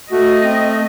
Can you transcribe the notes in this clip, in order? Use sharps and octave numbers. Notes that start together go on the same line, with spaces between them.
A3 F#4 D#5
C4